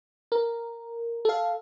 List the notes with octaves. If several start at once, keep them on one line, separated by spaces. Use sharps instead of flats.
A#4
A4 F5